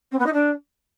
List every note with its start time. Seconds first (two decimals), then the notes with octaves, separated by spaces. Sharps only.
0.11 C4
0.19 B3
0.26 D#4
0.33 D4